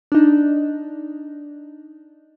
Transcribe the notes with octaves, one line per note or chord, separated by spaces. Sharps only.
D4 D#4